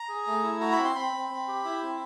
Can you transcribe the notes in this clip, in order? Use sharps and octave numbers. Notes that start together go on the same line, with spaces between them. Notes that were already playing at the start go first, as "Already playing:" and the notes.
Already playing: A#5
G#4
A3
E4
F#4 A#5
B5
C4
C6
C4 B5
C4
C4
G4
E4
C4